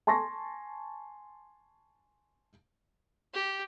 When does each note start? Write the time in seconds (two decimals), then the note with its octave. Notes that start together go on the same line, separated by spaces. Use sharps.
0.07 G#5 A5 C6 C#6 A#6
3.34 G4